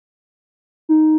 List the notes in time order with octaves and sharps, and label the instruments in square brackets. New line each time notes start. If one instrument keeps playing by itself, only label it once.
[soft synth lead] D#4